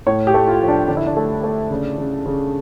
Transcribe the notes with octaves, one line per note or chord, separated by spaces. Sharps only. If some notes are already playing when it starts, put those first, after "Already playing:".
A2 C#5
G4
A3
F4
F3
D4
D3 D4
E4
D4
A3
A3
C#3
C#3
C#3